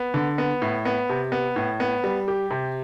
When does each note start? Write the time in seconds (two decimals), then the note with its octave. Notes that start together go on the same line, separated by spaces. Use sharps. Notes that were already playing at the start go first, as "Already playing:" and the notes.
Already playing: B3
0.14 D3
0.38 B3
0.62 A2
0.85 B3
1.09 C3
1.32 B3
1.56 A2
1.80 B3
2.04 G3
2.28 G4
2.50 C3